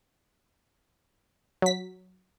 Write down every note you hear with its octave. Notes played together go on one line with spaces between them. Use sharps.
F#3 B6